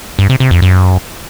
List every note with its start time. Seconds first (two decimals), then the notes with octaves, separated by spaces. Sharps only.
0.19 G2
0.29 C3
0.40 C3
0.51 F2
0.62 F#2